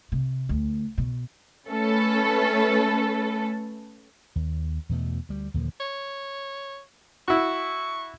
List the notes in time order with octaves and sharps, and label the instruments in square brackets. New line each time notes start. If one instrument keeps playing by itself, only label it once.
[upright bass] C3
D2
B2
[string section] A3 C#4 A4 B4
[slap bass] D#2
E2 B2 A3
D2 G3
D#2 A#2 D3 F3
[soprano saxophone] C#5
[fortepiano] E4 F#4 [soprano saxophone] C#6